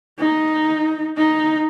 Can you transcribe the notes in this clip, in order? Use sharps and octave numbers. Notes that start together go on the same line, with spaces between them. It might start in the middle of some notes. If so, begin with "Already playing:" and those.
D#4
D#4